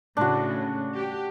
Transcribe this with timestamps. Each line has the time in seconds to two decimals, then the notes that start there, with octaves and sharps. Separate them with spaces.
0.17 A2 C#3 D4 F#4
0.94 G4